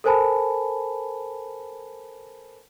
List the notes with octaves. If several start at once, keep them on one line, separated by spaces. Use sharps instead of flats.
A4 A#4 C5 G#5 A5 B5